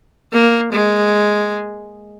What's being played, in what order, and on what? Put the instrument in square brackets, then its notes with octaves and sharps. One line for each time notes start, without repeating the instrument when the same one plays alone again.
[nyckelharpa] A#3
G#3